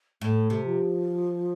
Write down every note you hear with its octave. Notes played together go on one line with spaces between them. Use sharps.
A2 A3
C3
F3